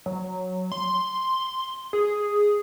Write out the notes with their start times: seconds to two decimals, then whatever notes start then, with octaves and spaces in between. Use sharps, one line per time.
0.06 F#3
0.72 C6
1.93 G#4